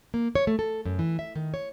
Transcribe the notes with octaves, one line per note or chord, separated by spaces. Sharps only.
A#3
C#5
A3
A4
F#2
E3
E5
D#3
C#5